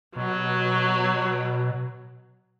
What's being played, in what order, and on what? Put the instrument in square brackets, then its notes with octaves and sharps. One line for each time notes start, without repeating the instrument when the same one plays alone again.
[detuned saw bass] B2 [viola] F#3